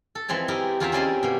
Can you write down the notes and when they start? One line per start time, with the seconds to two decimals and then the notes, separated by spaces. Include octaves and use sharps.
0.15 A4
0.28 E3 F3 G#3 C4 C#5
0.48 D#4 E4 G4 A#4 D#5
0.80 E2 F4 G4 G#4 E5 A#5
0.92 C4 C#4 E4 D5 D#5 C6
1.23 B2 A#3